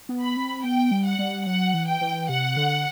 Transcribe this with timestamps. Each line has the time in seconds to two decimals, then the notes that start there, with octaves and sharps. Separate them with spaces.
0.09 B3
0.22 B5
0.36 C4
0.64 B3 G5
0.91 G3
1.06 F#5
1.19 G3
1.46 F#3 F#5
1.74 E3
1.88 G5
2.01 E3
2.29 C3 F#5
2.57 D3